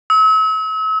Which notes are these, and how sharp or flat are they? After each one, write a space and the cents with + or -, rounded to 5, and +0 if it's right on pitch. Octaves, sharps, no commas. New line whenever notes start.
E6 -40